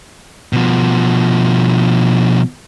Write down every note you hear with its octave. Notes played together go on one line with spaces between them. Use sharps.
B2 F3